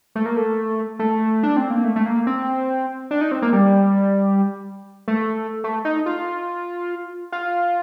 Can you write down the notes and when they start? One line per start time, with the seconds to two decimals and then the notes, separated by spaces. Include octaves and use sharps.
0.15 A3
0.26 A#3
0.36 A3
0.99 A3
1.43 D4
1.57 C4
1.70 A#3
1.84 A3
1.96 A3
2.06 A#3
2.27 C4
3.11 D4
3.21 D#4
3.32 C4
3.42 A#3
3.53 G3
5.08 A3
5.64 A3
5.85 D#4
6.06 F4
7.32 F4